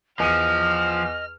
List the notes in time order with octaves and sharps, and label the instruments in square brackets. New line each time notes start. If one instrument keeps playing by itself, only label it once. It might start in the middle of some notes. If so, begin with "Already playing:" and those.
[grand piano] E2 D#7 [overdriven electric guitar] F3 [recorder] D#5 [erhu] F6